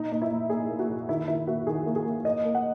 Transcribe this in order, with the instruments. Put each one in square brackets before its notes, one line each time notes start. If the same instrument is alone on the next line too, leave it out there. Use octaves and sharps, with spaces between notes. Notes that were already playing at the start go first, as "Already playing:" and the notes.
Already playing: [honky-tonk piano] A#2 D#4
A#2 D#4
E4
A#2
A#2 G#4
A#3
F#4
A#2
D#3 E4
D#3 E4
A#3 F#4
D#3 G#4
A#3
G#4
A#3
A#3 D#5
A#3
F#5